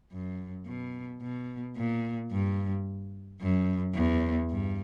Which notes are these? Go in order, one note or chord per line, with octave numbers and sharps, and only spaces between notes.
F#2
B2
B2
A#2
G2
F#2
E2
G2